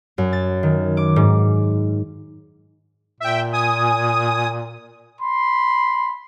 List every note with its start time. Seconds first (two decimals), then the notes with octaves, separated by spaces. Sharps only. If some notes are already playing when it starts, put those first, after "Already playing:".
0.18 F#2
0.33 A6
0.63 D#3
0.97 D6
1.16 G#2
3.20 A#2 E5 G5
3.53 G#5 D#6
5.22 B5 C6